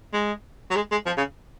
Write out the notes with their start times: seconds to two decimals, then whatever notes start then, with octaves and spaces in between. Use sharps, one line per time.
0.14 G#3
0.70 F#3
0.76 G#3
0.92 G#3
1.06 F3
1.17 C#3